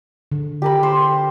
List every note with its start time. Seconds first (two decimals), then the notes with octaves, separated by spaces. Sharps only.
0.32 D3
0.62 G4 A#4 B5
0.83 C5